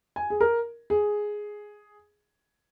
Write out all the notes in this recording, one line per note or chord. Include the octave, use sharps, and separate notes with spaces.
G#5
G#4
A#4
G#4